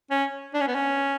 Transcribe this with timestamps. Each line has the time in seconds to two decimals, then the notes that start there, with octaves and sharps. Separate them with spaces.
0.11 C#4
0.54 D4
0.61 C#4
0.67 B3
0.75 C#4